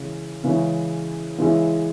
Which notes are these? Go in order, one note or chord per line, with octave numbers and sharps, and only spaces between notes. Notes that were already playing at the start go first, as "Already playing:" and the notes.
Already playing: C#3 E3 G#3 C#4 E4
C#3 E3 G#3 C#4 E4
C#3 E3 G#3 C#4 E4